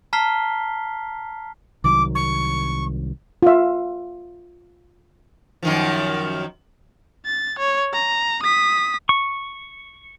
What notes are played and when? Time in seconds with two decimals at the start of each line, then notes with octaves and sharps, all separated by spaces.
0.13 A5 A#5 F6 B6 C7 G7
1.84 C2 D#3 F#3 D6
2.15 C#6
3.42 F4 E5
5.63 F#2 D#3 F3
7.26 A6
7.59 C#5
7.93 A#5
8.43 D#6 B6
9.09 C#6